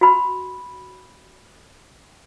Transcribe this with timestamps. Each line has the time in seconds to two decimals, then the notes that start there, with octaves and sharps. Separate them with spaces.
0.01 F#4 B5